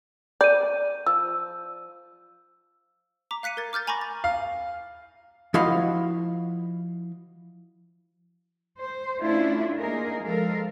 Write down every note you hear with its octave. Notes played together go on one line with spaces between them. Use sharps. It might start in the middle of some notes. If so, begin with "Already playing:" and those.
D5 G6 D#7
F3 E6
A#5 D6 B6
F5 F#6 B6 C#7 D#7
A#4 G#6 A6
D6 F6 G6 A6
G#5 A#5 B5 C#6 D6 A#6
A6
F5
F3 E4 F#4 D#5 F5 B5
C5
A3 C#4 D4 E4 F4
A#3 D#4 G#4 A#4
F3 G#3 A4 A#4 F5